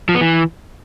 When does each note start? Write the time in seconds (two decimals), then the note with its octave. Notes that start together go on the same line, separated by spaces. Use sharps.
0.09 F3
0.15 B3
0.21 E3